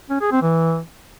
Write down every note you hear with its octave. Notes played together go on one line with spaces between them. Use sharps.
C#4
G#4
C4
E3